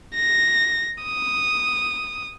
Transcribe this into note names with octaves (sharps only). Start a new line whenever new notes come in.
A#6
D#6